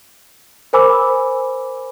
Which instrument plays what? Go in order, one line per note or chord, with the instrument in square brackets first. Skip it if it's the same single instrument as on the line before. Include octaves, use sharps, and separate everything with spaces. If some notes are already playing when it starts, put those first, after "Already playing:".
[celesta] A#4 C5 G#5 B5 D6 E6